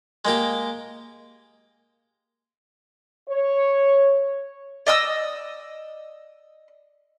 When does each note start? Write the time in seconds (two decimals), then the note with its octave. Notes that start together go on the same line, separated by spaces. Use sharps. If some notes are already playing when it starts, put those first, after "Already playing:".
0.25 G#3 A#3 G4
3.29 C#5
4.86 D5 D#5 D#6 E6